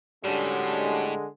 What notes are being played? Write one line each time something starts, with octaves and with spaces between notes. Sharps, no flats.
A2 D3 G3 G#3 C#4 D4 F#4